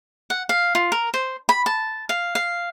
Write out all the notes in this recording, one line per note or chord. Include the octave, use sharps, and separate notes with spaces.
F#5
F5
F4
A#4
C5
B5
A5
F5
F5